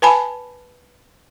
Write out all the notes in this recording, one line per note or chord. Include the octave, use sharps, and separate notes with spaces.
B4 G#5 A5 B5